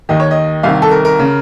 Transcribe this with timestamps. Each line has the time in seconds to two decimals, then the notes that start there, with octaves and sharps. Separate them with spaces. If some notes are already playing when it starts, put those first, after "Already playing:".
0.09 D#2 D#3 D#5
0.20 C#5
0.31 D#5
0.63 C2 C3 D#3 F5
0.82 A4
0.91 A#4
1.05 A#4
1.19 C#3